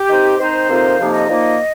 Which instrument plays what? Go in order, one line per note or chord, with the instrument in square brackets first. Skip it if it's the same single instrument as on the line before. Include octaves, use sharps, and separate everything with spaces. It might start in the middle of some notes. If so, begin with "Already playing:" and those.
Already playing: [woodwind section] G4
D#3 C4 D#4
D#3 C4 D#4 C5
F2 C3 F3 A#3 D#4
F2 C3 F3 A#3 D#4 F5
D#5
A#2 F3 A#3 D#4